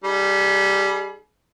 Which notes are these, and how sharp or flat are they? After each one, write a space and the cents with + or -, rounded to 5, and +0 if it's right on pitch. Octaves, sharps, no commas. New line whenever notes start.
G3 +0 D#4 -20 G#4 +35